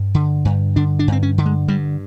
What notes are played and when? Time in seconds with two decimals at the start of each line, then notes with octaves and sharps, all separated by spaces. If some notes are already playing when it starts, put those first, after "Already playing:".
Already playing: G2
0.15 D3
0.45 G2
0.76 D3 D4
0.99 D4
1.08 G2 C4
1.23 C#4
1.38 D3
1.46 G#3
1.68 G2 G3